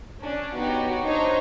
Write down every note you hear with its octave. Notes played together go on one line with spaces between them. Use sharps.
C#4 D4
B3 D#4 F#4 G4 C#5
D4 D#4 C5 C#5 D#5 A#5